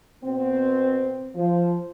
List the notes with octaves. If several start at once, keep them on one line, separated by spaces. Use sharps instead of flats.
B2 B3 C4
F3